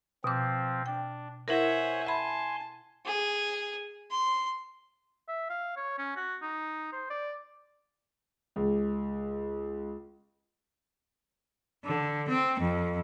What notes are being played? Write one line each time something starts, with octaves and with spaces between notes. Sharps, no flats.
B2 F3 C4 D6
D4 G5
E4 A#4 C5 C#5 E5 F#5 G#5
E5 G#5 A5 B5 C6
G#4
C6
E5
F5
C#5
C#4
F#4
D#4
C5
D5
C#2
D3
C4
F2